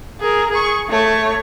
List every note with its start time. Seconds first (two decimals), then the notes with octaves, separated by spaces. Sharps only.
0.21 G#4 A#4
0.51 G#4 C#6
0.89 A3 C#5